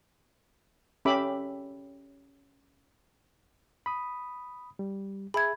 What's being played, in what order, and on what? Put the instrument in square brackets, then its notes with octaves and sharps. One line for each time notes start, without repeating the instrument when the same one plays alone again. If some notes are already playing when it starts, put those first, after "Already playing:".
[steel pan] C#4 G4 A4 E5 B5 D6
[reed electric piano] B5 D#6
G3
[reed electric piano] G#4 E5 [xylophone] B5 G#6